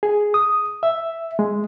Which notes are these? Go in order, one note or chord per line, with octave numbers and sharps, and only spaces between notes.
G#4
D#6
E5
G#3